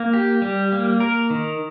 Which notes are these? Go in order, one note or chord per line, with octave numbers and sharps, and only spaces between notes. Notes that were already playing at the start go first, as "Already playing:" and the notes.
Already playing: A#3
G4
G3
A#3
A#4
D#3